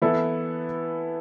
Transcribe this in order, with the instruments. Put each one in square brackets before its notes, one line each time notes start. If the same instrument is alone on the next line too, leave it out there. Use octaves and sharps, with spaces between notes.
[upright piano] E3 B3 E4 A4